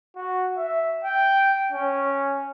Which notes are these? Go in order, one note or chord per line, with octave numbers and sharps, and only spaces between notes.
F#4
E5
G5
C#4